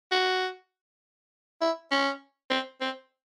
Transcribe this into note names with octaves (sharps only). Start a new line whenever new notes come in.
F#4
E4
C#4
C4
C4